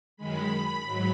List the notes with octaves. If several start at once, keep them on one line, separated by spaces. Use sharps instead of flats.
F#2 D#3 G#3 B5
G#2 F#3